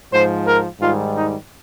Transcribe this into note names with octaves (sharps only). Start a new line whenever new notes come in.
G#2 F3 C5
A#4
G#2 D#3 G3 F4
D#4